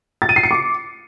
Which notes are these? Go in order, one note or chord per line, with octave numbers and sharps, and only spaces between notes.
A6
D#7
C7
C#7
D6